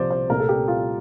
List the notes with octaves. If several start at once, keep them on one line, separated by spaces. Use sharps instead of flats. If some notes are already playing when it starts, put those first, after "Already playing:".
Already playing: C2 C3 F3 C5 D5
C5
C2 A#2 A3 C4 A#4
A4
G4
F4